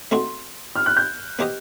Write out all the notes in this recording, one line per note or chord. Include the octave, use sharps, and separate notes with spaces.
A3 C4 D#4 F#4 C6
F6
F#6
G6
B3 D#4 G4 C5 D#5